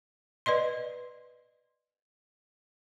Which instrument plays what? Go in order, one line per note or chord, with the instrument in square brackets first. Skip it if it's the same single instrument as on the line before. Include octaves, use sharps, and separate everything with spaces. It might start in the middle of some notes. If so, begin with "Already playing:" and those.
[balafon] B4 D5 D#5 C6